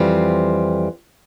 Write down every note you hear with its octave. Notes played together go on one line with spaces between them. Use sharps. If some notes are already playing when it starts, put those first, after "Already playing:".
Already playing: F2 E3 G3 C4 F4